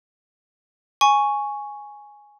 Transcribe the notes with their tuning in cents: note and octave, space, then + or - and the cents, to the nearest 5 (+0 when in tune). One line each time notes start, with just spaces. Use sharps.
G#5 +0 C#6 +0